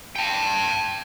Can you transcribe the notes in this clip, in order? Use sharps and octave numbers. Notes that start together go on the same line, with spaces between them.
G5 A5